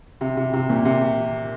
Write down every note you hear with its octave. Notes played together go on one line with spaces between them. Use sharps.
C3
C3
C3
A#2
C3